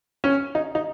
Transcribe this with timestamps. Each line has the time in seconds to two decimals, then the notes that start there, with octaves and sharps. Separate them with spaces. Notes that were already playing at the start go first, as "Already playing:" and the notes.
0.24 C#4
0.55 D#4
0.75 D#4